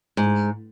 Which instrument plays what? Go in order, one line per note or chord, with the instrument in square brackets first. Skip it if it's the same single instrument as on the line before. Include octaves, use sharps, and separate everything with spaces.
[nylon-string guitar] G#2